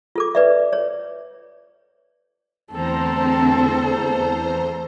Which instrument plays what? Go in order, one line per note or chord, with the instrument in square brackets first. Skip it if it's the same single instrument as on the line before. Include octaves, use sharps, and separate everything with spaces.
[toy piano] F4 A4 D6
B4 D5 E5
C#5
[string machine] E2 C5 A#5 [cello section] D3 C4 [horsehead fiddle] A3 A4